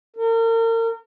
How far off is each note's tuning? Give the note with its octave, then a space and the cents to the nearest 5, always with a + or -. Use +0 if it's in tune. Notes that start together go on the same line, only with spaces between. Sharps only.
A#4 -35